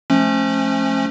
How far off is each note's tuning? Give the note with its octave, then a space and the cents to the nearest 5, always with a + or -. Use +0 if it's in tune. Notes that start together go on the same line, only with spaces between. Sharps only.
F3 +0 A3 -20 C#4 -25